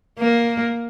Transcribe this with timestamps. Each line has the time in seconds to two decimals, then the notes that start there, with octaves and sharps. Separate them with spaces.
0.19 A#3